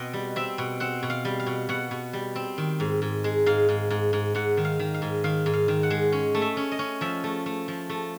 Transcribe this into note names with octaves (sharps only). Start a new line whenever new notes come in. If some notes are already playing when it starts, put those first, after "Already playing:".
Already playing: B2 C4 D#5
G3
C4 E5
B2
C4 F#5
B2
F5
G3
F5
B2
B2 F#5
B2
G3
C4
D#3
G#2
G#2
G#3
G#2 F5
G#2
G#2
G#2
G#2 F#5
D#3
F5
D#3
F5
G#2
D#3 F5
G#2
F5
D#3
F#5
G#3
C#4
A3
E5
C#4
D#5
C#4
F3 E5
A3
A3
F3
A3